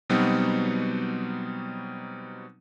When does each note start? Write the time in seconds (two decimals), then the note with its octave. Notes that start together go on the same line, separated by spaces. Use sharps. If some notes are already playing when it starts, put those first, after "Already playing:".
0.10 B2 F#3 G3 B3 C4 D#4